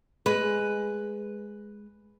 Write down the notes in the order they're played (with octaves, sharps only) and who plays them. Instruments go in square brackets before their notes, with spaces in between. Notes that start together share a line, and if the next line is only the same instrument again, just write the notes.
[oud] G#3 [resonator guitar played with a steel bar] B4